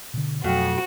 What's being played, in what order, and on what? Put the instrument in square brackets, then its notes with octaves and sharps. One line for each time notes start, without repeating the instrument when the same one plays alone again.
[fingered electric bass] B2 D3
[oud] F2 [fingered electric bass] B2 F#3 A3 [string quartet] F#4